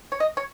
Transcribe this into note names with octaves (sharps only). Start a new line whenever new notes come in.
C#5
D#5
C#5